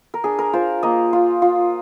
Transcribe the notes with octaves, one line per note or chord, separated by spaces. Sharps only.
A#4
D4 G#4
A#4
F4 C5
A#3 D#5
F4
F4